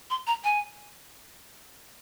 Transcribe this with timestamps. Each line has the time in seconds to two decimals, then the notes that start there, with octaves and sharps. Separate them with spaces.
0.10 C6
0.27 A#5
0.44 G#5